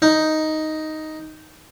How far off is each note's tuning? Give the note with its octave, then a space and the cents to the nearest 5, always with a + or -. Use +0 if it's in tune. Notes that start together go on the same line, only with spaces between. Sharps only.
D#4 +5